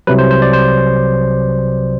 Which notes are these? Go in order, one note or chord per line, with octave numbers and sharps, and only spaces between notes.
C2 C3 F#3 B4
C5
C5
D5
C5